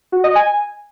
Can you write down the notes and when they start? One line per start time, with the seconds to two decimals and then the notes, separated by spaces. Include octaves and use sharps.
0.12 F#4
0.24 D#5
0.35 G#5